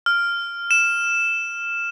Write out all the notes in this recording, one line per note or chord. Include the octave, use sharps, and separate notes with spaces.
F6
E7